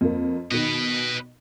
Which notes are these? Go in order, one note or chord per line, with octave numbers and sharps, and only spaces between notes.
F2 A#3
B2 D#3 B4 D#5